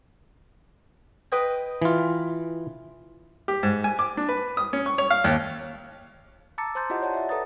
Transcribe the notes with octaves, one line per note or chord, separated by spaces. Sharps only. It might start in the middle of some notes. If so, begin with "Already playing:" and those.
B4 D#5 G5
E3 F4
G4
G#2
G#5
D6
D4
B4
D#6
C#4
C#6
C#5
F5
D#2
A5 A#5 D6 E6 A6 C#7
C5 A5 A#5 C6 G6 A6
E4 F4 G4 D#5 F#5
C#5 D5 F#5 A5
D5 E5
A4 B4 A#5 D#6 A6